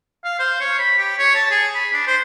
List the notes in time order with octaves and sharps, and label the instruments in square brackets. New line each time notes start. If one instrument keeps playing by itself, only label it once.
[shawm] F5
C5
C#5
B5
G4
C#5
A5
G#4
B5
D4
C5